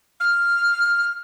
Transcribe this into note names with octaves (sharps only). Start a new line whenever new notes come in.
F6